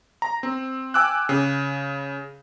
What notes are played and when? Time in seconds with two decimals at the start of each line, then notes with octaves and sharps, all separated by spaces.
0.22 A#5
0.43 C4
0.94 G5 G#5 D6 E6 F#6
1.29 C#3